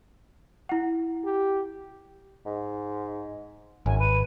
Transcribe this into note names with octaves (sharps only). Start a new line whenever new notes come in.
E4 F#5
G4
G#2
G#1 F#2 G#5
B4 D#7